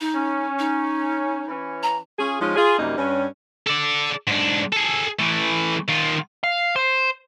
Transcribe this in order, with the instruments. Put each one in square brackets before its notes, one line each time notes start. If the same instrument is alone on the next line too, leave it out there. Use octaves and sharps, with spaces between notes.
[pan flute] D#4
[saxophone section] C#4
[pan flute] D#4
[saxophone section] E3 C#4
[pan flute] A#5
[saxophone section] C#4 F4 G#4
F3 G#3 C#4 D#4 F4
F4 G#4
F#2 C3 G3 A#3 D#4
G2 C#4
[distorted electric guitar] A4 D5
G#2 D4
G#4 A4
E3 A3
D#3 F4
[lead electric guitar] F5
C5